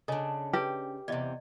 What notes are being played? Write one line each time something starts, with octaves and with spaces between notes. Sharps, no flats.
C#3 D4 A4 D#5 G#5
G4 B4 C#5 G5
E2 C3 D5 D#5